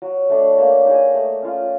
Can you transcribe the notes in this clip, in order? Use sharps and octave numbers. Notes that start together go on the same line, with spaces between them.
F#3
A3 D4
A#3
D#4 G#4
A3
C#4 F4